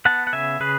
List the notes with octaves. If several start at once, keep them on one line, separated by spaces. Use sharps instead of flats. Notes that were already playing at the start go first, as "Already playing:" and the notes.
B3 F#5 A5
F#5
C#3 E5 G#5
C#3 G#4 B4